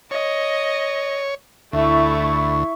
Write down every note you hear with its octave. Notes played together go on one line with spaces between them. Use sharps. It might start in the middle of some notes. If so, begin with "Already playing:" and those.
C#5 D#5
D2 A3 E4 E5 C#6